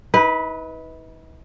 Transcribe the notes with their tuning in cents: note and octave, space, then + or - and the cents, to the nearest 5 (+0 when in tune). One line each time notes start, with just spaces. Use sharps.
D#4 +45 B4 -5